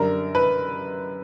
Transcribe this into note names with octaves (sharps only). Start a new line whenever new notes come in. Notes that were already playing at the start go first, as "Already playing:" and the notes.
Already playing: F#2 D3 G3 A#4
B4